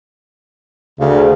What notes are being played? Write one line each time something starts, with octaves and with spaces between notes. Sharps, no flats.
D2 C#3